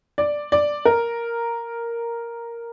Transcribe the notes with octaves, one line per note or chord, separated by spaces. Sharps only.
D5
D5
A#4